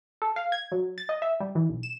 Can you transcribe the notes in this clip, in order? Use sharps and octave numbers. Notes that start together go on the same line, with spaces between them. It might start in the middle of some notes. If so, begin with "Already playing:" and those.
A4
F5
G#6
F#3
A6
D#5
E5
G3
E3
B1
E7